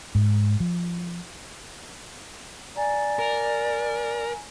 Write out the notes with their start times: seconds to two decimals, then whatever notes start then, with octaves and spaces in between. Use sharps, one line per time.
0.15 G#2
0.60 F3
2.76 D5 G#5 A#5
3.19 A#4